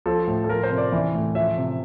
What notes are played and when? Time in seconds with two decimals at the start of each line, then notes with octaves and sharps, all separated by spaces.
0.06 F3 A4
0.27 A2
0.44 A4
0.49 F3 A#4
0.63 C5
0.70 C3
0.78 D5
0.92 E3
1.14 A2
1.35 F3 E5
1.57 C3